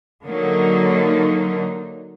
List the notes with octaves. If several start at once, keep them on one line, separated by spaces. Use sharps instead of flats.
D3 F#3 A#3 D#4